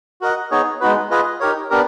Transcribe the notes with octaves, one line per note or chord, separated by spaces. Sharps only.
F#4 A#4 D#5 F#5
B3 D#4 G#4 C#5
G#3 B3 D#4 F#4 B4
F4 G#4 B4 D#5
D#4 G4 A#4 C#5
B3 D4 G4 A#4